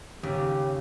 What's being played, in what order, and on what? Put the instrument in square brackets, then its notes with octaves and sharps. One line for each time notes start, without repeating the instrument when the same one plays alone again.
[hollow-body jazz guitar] D#2 [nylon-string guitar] C#3 [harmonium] G4